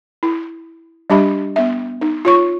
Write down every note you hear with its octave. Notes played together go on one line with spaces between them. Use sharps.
E4
G3 D4 G4 E5 B5
B3 E5
D#4
F4 C#5 C#6